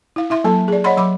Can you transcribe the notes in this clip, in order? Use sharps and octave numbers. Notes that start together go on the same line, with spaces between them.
E4 F5
E4 E5 C6
F#3 A#3 A4 A5
G#4 D5
C#5 D#5 F#5 B5 C6
F#3 B5 D6